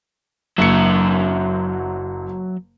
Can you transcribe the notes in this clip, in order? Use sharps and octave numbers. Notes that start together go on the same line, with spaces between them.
F#1 F#3 E5 C#7